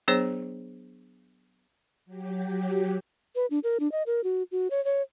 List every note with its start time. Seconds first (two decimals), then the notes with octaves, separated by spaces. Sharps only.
0.08 F#3 B3 D4 G#4 C5 C#5
2.06 F#3 G4
3.35 B4
3.51 D4
3.64 A#4
3.80 D4
3.92 D#5
4.07 A#4
4.24 F#4
4.52 F#4
4.70 C#5
4.85 C#5